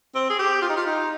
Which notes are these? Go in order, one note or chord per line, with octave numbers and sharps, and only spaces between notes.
C4
G#4
G4
F4
D#4
F4
D#4